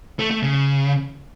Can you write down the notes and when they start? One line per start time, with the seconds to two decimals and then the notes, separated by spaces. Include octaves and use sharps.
0.19 A3
0.31 A3
0.43 C#3